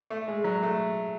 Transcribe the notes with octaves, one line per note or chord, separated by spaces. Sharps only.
A3
G#3
F#3
A3